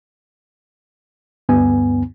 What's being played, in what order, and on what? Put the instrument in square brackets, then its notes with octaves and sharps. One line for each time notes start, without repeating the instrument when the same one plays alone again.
[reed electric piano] D2 G2 B3 G#5